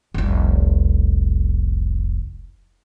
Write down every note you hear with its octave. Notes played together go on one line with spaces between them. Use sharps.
F1 C2